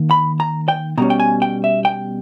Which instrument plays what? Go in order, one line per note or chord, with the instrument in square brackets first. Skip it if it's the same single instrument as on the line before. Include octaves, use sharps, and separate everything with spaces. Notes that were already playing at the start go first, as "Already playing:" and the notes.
Already playing: [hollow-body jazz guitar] D#3 A#3
B5
A#5
G5
B2 G3 C#4 A#5
G5
G#5
G5
E5
G5